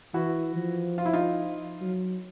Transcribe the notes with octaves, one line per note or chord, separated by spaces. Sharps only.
E3 E4 F#4
F3
F4
E4
D#4 F4
F#3